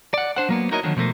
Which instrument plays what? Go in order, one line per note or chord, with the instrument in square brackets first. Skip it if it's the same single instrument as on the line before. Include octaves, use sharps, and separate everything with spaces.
[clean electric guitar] D5 F#5
D4 C5 F#5
F#3 A#3 B3
D#4 E4 F#4 A#4 C#5 D#5
D3 D#3 F3 F#3
B2 F3 A3 A#3